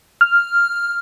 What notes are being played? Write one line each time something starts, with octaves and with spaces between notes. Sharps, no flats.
F6